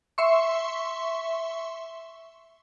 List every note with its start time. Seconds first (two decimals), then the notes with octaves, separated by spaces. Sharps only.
0.18 E5 C6 C#6